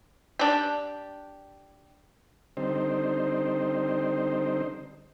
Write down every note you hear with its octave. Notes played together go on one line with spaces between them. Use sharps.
D4 G4
D3 G3 C4 D#4 C5